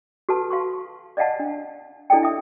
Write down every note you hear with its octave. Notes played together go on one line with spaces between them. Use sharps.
F#4 A4 B4 A5 B5
F5 C6 C#6
D5 D#5 F5 F#5 A5
D4
D4 E4 A4 D5 D#5 G5
E5 D#6